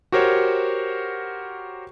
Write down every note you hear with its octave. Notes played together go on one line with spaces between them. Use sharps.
F#4 G4 A#4 C5 C#5